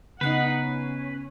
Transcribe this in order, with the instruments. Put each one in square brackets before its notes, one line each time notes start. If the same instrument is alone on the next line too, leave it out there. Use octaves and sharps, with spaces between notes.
[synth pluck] C#3 B3 C7 [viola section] D#4 F#5 [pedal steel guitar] B4
[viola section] C#4